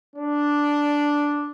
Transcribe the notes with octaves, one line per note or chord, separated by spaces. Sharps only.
D4